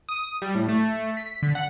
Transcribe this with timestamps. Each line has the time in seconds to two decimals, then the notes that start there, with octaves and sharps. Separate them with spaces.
0.09 D#6
0.42 G3
0.55 A2
0.69 A3
1.17 B6
1.42 D3
1.55 F#5